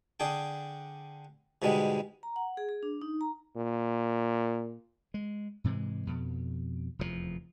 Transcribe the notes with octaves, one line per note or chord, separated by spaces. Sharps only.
D3 D4 G#4 G5
G#2 B2 D3 G3 G#3
A#5
F#5
G#4
G#4
D4
D#4
A#5
A#2
G#3
G#2 C3 E3 G#3
F2 B2
F1 E2 B2 F3